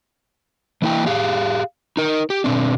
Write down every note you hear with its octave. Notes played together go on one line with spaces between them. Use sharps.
E3 A#3 E4 G5
G4 G#4 F5
D#4 A#4
G4
B2 C4 D4